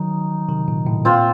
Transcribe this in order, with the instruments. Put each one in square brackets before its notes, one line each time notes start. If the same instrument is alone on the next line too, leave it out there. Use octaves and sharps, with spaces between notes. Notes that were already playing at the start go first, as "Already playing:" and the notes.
Already playing: [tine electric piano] D#3 F#3 [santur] D#4
[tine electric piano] C3 D#3
A#2
A2
[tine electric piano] A#2 [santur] C4 F4 C5